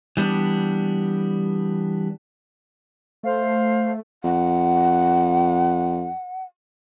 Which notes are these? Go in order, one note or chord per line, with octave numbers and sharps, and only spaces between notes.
E3 G3 B3 D4
A3 C5 F5
F2 F#5